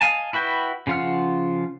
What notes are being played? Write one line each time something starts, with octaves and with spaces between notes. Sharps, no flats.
D#5 F5 G#5 A5
E4 F#4 B4 G5
C#3 F3 F4 F#5 F6